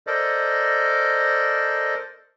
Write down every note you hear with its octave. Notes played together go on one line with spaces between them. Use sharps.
A4 A#4 C5 D5 D#5